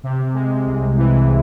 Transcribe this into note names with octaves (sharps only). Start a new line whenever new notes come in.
C3
G#3
C2
E3